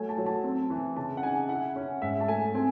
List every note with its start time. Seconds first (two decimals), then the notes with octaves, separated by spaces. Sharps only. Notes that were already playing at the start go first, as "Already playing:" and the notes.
Already playing: F#3 A3 G#5
0.09 A5
0.17 F#3
0.26 A5
0.44 C4
0.70 E3
0.96 C#3 A5
1.17 F#5
1.23 D#4 G#5
1.49 E4 F#5
1.76 C#4
2.02 G#2 E5
2.20 A5
2.28 A3 G#5
2.54 C4 G#5